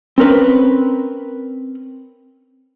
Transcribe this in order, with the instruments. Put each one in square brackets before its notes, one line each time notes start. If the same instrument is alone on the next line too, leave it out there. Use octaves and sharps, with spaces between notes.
[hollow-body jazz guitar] C4 C#4 A#4 B4